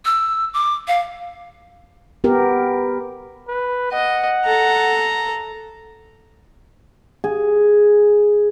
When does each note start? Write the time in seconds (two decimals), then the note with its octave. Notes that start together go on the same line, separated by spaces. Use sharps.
0.05 E6
0.54 D6
0.88 F5
2.24 B3 G4 A#4
3.48 B4
3.92 D#5 F#5
4.45 A4 A#5
7.24 G#4